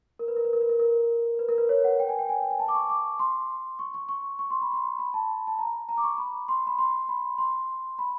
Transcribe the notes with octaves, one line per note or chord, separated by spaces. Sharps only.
A#4
B4
A#4
B4
A#4
B4
A#4
A#4
B4
A#4
B4
C#5
F#5
G5
G#5
G5
G#5
G5
G#5
A5
D6
C#6
D6
C6
C#6
C#6
C#6
C#6
C6
B5
C6
B5
A5
A5
A#5
A#5
D6
C#6
B5
C6
B5
C6
B5
C6
B5